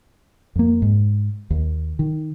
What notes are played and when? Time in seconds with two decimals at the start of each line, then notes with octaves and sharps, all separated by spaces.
0.56 F2 A#3
0.82 G#2
1.50 D#2
1.99 D#3